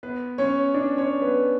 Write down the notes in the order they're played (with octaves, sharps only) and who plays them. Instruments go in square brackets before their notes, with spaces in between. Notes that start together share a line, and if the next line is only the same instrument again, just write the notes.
[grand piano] B3 B4
C#4 C#5
D4 D5
C#4 C#5
B3 B4